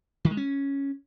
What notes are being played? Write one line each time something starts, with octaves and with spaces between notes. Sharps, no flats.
D#3
G#3
C#4